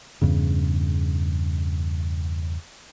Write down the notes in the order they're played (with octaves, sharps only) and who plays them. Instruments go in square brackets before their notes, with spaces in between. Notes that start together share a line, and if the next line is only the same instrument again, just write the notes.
[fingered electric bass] E2 G2 C#3